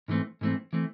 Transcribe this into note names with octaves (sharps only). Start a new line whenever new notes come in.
G#2 E3 A3 C4
G#2 E3 A3 C4
E3 A3 C4